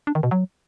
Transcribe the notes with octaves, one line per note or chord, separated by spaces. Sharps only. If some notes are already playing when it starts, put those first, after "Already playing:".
D4
D#3
B2
F#3